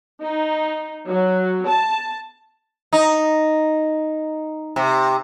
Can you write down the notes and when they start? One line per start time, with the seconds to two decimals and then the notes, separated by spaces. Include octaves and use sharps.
0.22 D#4
1.07 F#3
1.67 A5
2.93 D#4
4.76 C3